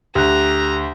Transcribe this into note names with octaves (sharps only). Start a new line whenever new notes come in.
D2 G4 A#5 F#6